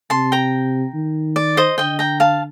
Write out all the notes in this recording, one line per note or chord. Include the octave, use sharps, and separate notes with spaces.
C3 A5 C6
G5 A#5
D#3
D5
C5 D#5
D3 D#5 G5
G5 A#5
F5 A5